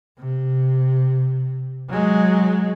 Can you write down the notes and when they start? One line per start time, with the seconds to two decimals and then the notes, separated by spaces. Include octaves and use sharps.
0.19 C3
1.89 F#3 G#3